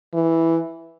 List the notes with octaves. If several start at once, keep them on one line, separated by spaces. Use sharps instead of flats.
E3